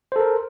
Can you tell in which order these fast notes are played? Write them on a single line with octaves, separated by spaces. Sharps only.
C5 A4 A#4